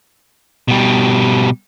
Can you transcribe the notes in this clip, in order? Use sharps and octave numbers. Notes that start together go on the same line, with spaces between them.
B2 G3